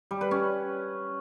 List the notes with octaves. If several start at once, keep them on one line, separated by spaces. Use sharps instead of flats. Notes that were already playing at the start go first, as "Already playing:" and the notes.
G3
B4
C#4